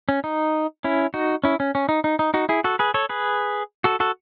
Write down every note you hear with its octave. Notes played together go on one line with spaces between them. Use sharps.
C#4
D#4
C#4 E4
D#4 F#4
C#4 E4
C#4
C#4
D#4
D#4
D#4
D#4 F#4
E4 G#4
F#4 A4
G#4 B4
A4 C#5
G#4 B4
F#4 A4
F#4 A4